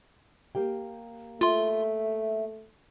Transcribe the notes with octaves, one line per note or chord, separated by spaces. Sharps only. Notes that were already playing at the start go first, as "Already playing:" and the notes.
A#3 G4 G5
A3 F4 E5 C6